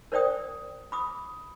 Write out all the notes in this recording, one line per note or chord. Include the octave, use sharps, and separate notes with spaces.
A#4 C5 D5 G5 D#6
B5 D6 D#6